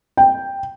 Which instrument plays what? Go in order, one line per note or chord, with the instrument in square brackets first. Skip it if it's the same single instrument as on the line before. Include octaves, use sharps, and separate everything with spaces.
[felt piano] G5